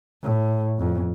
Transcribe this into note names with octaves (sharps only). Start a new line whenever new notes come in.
A2
F2